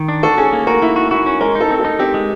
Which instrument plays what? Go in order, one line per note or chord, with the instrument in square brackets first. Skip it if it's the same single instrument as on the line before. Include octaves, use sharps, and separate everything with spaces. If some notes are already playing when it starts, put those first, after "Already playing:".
Already playing: [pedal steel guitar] D#3
D4
[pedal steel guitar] F#4 [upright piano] A4
[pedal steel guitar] C#4 [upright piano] G#4
[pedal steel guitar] A#3
[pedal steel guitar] F#4 [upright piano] A#4
[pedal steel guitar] A#3 [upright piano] E4
[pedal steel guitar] F#4
[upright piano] E4 [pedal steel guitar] F#4
[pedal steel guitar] C#4
[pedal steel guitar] G#3 [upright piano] A#4
[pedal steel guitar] D#4
[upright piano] A4
[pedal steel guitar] C4
[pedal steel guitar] D#4 [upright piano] A4
[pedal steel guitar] C4 [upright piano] G4
[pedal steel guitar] G#3